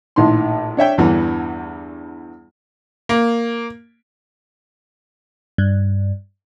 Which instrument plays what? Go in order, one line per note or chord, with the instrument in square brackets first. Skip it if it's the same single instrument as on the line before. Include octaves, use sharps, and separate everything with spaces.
[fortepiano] A#1 A2 D#3 C6
D4 C#5 E5 G5
E2 G2 D3 E3
[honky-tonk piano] A#3
[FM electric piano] G2